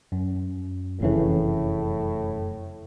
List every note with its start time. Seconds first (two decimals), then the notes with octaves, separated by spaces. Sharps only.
0.12 F#2
1.01 F1 A2 C#3 E3